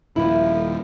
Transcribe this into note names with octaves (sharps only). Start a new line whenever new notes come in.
D#1 F3 E4